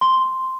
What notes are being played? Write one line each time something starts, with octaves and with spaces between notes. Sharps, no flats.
C6